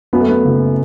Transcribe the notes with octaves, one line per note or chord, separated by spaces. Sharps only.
F#2 B3
A3
B3
F#1